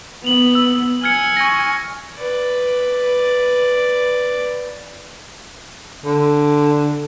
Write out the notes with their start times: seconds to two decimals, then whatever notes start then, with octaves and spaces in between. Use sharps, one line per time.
0.24 B3 F7 F#7
0.55 E6 F#7
1.04 G#5 F6 G#6 C#7
1.36 C#6 A#6
2.17 B4 D5
6.05 D3